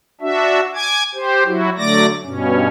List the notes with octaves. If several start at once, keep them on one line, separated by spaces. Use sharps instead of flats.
D4 F#4 E5
G#5 D6 G#6
G4 C5
F#3 E4 F#4
D3 F#3 A3 D5 D6 A#6
G2 B2 C#4